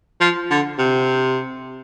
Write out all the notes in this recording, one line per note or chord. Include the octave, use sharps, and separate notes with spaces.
F3
D3
C3